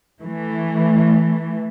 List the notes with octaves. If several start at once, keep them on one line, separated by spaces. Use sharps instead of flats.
E3 A3